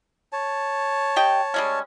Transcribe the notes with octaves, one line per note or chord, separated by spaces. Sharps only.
C#5 A5
G4 D#5 G5
G3 G#3 C#4